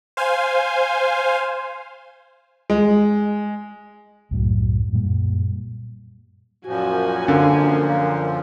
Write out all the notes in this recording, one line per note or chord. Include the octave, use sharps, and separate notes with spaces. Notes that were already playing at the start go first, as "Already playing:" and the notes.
C5 F5 G#5
G#3
C2 F#2 A2 F#3
F#2 A#2 G3 A#3
F#2 A#2 F3 F#4 G#5
D3 A#3
A#3